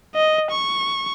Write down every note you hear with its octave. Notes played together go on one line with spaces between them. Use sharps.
D#5
C#6